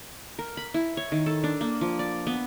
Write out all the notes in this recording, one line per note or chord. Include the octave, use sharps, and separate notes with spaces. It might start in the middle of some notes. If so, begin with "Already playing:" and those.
A#4
B5
E4
C#5
D#3
A4
D4
A#3
F3
D5
B3